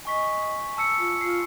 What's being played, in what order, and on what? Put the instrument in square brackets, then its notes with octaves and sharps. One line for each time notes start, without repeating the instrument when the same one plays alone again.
[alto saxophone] D#5 [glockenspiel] G#5 C#6 B6
[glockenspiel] A5 E6 C#7
[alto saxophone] F4
[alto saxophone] F4 [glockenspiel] C7